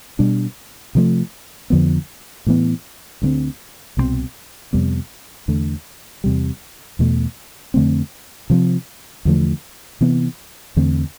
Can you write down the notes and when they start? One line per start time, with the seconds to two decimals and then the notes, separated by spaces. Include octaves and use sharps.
0.19 B2 G3 D4
0.95 C3 F3 A3
1.70 F2 D3 F3 B3
2.46 A2 E3 B3
3.22 D2 D3 A3 C4
3.97 C2 B2 G3 C4
4.73 F2 C3 G3 B3
5.48 E2 D3 A3
6.24 E2 C3 G3
6.99 E2 B2 A3
7.74 F2 D3 A3 C4
8.50 C3 F3 C4
9.25 E2 D3 F3 A3
10.01 C3 E3 B3
10.76 E2 D3 A3 C4